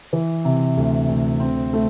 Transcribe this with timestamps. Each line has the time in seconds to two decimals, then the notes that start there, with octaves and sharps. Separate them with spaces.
0.13 E3
0.45 C3
0.77 D2
1.09 D2
1.40 C4
1.73 A3